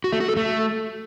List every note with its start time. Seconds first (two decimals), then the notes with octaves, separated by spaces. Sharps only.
0.04 F#4
0.12 A3
0.20 F#4
0.28 A4
0.37 A3